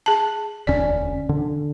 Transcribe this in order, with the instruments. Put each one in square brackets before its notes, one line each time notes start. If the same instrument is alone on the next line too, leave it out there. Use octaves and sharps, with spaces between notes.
[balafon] G#4 A5
[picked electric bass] E1 D2 C#4 [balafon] D5
[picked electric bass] D3